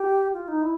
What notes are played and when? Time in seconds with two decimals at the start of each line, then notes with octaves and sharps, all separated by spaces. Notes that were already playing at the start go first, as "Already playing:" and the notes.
Already playing: G4
0.34 F4
0.48 D#4
0.62 E4